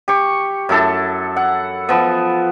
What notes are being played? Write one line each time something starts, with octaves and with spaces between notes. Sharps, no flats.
G4 C#6
F#2 E4 A4 A5
F#5
F3 B3